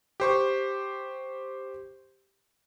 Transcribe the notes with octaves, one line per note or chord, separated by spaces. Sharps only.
G4 C5 C#6